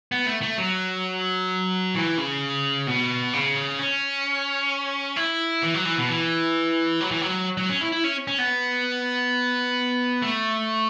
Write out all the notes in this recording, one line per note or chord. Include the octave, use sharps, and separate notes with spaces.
B3
A3
A3
F#3
E3
C#3
B2
C#3
C#4
E4
E3
F#3
E3
B2
E3
F#3
E3
F#3
F#3
C#4
E4
E4
C#4
C#4
B3
A3